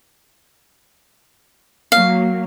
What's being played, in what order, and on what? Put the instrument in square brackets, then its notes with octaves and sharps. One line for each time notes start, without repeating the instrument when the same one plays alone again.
[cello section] F#3 A#3 [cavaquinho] F5